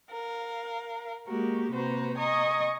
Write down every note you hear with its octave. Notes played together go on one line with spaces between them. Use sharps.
A#4 F5
G#3 A#3 F#4 G4 A#4
C3 A#3 F#4 B4 C5 A#5
D#5 G#5 A#5 C#6 D#6